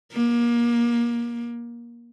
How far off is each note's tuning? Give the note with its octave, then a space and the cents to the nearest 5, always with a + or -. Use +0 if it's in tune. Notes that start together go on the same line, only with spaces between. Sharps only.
A#3 +25